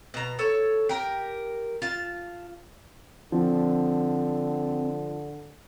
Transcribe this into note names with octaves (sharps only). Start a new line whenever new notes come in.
B2 A#5
A4 C#5
G4 A#4
F4 A5
D3 F3 C4